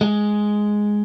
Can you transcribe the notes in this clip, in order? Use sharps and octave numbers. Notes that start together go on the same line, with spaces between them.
G#3